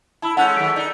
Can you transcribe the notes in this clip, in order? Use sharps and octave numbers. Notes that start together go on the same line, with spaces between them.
E4 A5 B5 E6
G#3 C#4 A4 F#5 A5 F#6 G6
D#3 F#3 B6 D7
D#4 D5